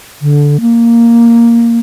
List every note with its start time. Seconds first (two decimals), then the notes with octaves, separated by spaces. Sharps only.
0.22 D3
0.61 A#3